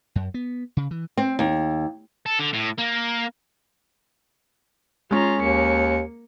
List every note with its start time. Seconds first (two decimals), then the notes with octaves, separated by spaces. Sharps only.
0.15 F#2
0.34 B3
0.77 C#3
0.91 E3
1.17 C4
1.39 D#2
2.26 A4
2.39 D3
2.54 A2
2.79 A#3
5.11 G#3 C#4 F4 A#5
5.41 D#2 A#3 C#7